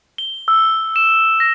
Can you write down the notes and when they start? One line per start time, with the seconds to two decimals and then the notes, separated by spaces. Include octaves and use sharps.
0.18 G7
0.48 E6
0.96 E7
1.40 A#6